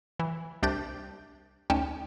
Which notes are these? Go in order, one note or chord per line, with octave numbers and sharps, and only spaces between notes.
E3
C2 D4 G4 D6 G6 A6
D2 C#4 D#4 G5 A5